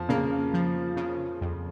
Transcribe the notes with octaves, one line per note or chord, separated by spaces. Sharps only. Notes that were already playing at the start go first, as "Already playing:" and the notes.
Already playing: F2 F3
C#3 A#3
F3
C#3
F2